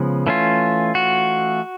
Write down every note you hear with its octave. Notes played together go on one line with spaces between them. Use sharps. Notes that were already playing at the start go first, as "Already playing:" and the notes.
Already playing: C#3 F3 G#3 B3
E3 A3 C#4 F4
F#4